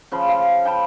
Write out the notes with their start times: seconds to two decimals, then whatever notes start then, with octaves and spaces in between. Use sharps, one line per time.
0.12 C#3 F3 B5
0.29 F5
0.65 G5 A5 B5